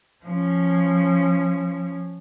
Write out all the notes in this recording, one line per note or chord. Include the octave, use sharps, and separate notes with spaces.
F3 C#4